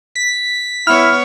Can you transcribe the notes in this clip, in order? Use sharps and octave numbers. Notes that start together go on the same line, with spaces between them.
B6
B3 E4 C#5 F6